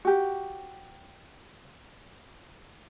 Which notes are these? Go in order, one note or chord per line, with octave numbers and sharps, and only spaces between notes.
F#4 G4